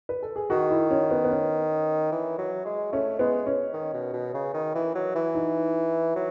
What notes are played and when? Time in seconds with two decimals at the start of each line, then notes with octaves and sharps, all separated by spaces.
0.09 B4
0.22 A4
0.36 G#4
0.50 D#3 F#4
0.71 E4
0.90 C#4
1.11 B3
1.24 B3
1.31 C#4
2.12 E3
2.38 F#3
2.65 G#3
2.92 A3 C#4
3.19 G#3 B3
3.46 C#4
3.73 D#3
3.94 B2
4.13 B2
4.34 C#3
4.54 D#3
4.75 E3
4.95 F#3
5.15 E3
5.35 D#4
6.16 F#3